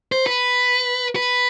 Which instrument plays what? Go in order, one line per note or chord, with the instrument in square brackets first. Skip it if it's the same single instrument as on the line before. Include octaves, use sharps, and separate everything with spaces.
[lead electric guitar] C5
B4
B4